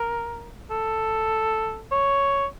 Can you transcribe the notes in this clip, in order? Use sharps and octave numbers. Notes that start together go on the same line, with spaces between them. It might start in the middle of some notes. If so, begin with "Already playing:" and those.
Already playing: A#4
A4
C#5